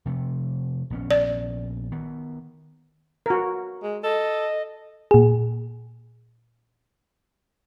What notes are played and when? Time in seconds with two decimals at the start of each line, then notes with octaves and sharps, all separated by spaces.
0.06 C3 F3 A3
0.90 A#1 B3 C#4
1.11 D5
1.92 D#3 B3
3.26 F#4 A#4
3.83 G#3
4.03 A4 D#5
5.11 A#2 G#4